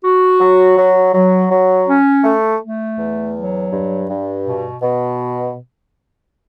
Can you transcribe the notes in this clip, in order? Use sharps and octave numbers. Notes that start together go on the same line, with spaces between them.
F#4
F#3
F#3
F#3
F#3
C#4
A3
A3
E2
F#3
G2
G2
B2
B2